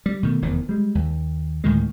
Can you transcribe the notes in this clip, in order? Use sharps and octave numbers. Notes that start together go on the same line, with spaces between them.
G3
B2 D#3 A3
F1 E2 D#3
G3 G#3
D#2
D2 A2 D#3 G#3